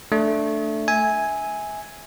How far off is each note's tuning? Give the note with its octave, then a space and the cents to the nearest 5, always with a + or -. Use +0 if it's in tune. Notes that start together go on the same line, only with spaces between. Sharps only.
A3 +0 D4 +0
E5 -20 G#5 +0